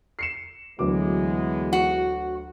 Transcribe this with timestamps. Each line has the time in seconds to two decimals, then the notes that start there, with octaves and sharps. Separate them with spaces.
0.19 C7 C#7 E7
0.79 D2 E3 F#3 G#3 B3 D6
1.73 F#4